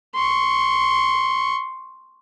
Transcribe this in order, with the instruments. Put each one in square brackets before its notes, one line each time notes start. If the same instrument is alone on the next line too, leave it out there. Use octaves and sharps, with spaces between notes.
[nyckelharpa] C6 C#6